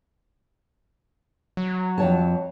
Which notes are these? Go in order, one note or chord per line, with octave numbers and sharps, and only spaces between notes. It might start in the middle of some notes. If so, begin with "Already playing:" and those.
F#3
F2 C#5 A5